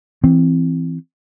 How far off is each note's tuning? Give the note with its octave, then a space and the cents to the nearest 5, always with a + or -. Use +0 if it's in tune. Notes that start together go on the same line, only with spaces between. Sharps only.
E3 +5 C4 -5